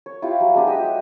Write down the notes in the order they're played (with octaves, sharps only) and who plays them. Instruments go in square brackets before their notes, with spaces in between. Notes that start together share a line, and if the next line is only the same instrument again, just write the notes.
[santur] C#5
E4 F4 G4 F5
F#3
G#3 B3 D4 G4
G4 B4 D#5 E5
F#3